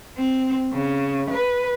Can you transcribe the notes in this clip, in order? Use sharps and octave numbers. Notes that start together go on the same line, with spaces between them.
C4
C#3
B4